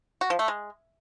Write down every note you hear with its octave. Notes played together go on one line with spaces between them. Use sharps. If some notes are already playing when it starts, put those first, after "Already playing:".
F#4
F3
A3
G#3